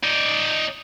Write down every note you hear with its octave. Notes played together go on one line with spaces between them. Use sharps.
D#4 D5